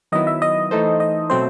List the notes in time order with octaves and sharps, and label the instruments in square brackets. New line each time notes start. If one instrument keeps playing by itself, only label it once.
[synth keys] D#3 F#3 B3 E4 [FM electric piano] D#5
[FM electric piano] E5
D#5
[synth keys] E3 A3 D#4 A4 C5
[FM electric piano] D#5
[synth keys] B2 F#3 A3 C4 [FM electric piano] C5